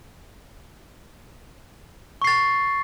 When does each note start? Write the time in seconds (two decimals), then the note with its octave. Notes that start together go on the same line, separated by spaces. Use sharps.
2.22 C#6
2.24 C7
2.27 A6